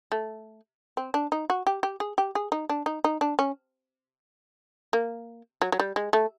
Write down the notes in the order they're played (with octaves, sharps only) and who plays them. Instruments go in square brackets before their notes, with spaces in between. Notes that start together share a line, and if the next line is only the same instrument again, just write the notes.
[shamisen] A3
C4
D4
D#4
F#4
G4
G4
G#4
G4
G#4
D#4
D4
D#4
D#4
D4
C#4
A#3
F#3
F#3
G3
G#3
A3